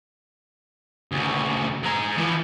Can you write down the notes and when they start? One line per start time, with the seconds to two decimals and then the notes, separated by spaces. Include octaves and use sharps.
1.11 D2 C#3
1.83 G#3 A#5
2.17 E3 F3